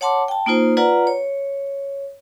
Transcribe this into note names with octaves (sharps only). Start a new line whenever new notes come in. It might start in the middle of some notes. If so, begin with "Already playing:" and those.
C#5 F#5 A5 C6 D6
G5 A5
A#3 D#4 F4 C5
F4 B4 D5 F#5 A#5
C#5